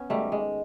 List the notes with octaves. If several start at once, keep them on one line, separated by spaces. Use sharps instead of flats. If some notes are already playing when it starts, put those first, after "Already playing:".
Already playing: B3 C#4
G#2 D#3 F#3 G3 A3
G#3